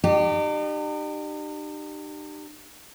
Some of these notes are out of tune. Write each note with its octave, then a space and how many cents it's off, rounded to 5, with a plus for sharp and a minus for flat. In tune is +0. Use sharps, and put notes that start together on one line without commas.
D#4 -45 G4 -10